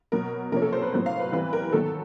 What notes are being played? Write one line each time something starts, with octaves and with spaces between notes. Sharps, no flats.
B2 F#3 B3 A#4
C3 F3 A#3 C#4 A#4
A4
C5
B4
A2 F#3 B3 C5
F5
B4
E3 G3 C4 B4
A#4
D#3 F#3 B3 A4